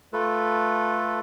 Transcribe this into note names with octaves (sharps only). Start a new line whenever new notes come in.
A3 F4 A4 B4